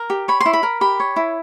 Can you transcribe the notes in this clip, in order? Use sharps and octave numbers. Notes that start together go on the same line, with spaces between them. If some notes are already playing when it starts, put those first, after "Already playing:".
Already playing: A#4
G4
C#5 B5
C6
E4
B5
A#4
G4 B5
C#5
E4